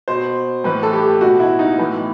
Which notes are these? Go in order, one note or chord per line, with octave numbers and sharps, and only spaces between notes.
B2 C5
A2 E3 B4
A4
G4
B2 F#4
E4
D#4
A2 E3 B3